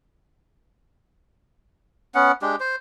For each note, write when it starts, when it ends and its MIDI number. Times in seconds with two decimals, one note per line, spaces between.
2.15 2.32 59
2.15 2.32 61
2.15 2.32 78
2.42 2.56 56
2.42 2.56 62
2.42 2.56 67
2.60 2.76 72